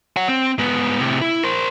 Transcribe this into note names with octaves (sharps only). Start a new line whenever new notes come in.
C#5 F#5
C4
G#2 B3
A2 C3
E4
A#4 C5